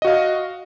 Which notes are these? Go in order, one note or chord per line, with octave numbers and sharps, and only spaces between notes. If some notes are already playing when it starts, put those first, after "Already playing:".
F#4 D#5 F5